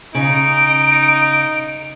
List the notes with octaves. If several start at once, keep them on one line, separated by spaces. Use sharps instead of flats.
C#3 D#4 D7